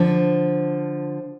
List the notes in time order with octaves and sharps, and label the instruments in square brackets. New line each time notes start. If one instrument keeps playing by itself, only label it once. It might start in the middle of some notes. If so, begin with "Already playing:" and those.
Already playing: [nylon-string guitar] D3 F3